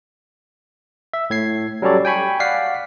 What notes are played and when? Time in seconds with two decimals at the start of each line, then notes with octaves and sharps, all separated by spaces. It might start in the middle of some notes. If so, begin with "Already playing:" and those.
1.13 E5
1.30 A2 G#6 C7
1.82 F#3 G3 C#4 A4 C#5 D5
2.05 G5 G#5 B5 C#6
2.40 D5 F5 F#5 B6 C7